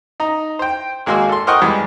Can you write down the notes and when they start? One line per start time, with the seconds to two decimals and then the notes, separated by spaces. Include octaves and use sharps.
0.20 D#4 A#5
0.59 C5 G5
1.06 G#1 G#3 A#3 F#4 C6 E6
1.29 A4 C6
1.47 A#4 C5 D#5 F#5 G5 C#6
1.62 E2 G3 G#3